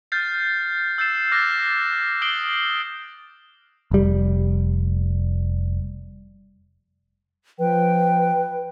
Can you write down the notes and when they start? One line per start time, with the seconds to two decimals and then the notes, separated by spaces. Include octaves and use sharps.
0.12 F6 G6 A6 C7
0.98 E6 G6 A6 C7 E7
1.32 D6 F6 F#6 A6 A#6 E7
2.22 D#6 G6 C7 D7 F#7 G7
3.91 F1 G3
7.59 F3 B4 G5